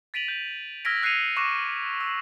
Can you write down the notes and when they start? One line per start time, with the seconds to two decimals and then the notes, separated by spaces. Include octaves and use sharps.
0.14 A6 B6 D7 D#7 F7 F#7
0.28 G6
0.85 E6 F6 G#6 A#6 B6 D7
1.02 E6 F#6 C7 C#7 D#7 F7
1.37 C#6 D6 F#6 A#6 E7
2.01 E6